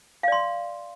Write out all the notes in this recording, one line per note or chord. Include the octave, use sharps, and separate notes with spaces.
D5 F5 C6